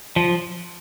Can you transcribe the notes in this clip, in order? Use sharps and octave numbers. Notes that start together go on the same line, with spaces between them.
F3